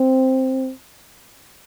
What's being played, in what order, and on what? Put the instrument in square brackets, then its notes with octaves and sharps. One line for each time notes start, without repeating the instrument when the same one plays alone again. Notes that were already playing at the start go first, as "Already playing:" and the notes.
Already playing: [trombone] C4